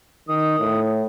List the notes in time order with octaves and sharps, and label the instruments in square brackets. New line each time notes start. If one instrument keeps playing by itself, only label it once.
[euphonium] D#3 [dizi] D#6
[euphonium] A2